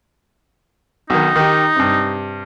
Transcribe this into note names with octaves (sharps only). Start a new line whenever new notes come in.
B1 D#3 D#4
D#3 G4
G2 C3